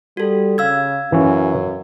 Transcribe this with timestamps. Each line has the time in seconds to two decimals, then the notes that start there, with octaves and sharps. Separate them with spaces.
0.17 G3 F#4 A4
0.58 C#3 F5 E6 G#6
1.12 F#2 E3 C#4